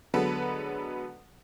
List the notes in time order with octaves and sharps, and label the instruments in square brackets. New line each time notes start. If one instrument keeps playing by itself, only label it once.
[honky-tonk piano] D3 F#3 G#3 B3 A4 B4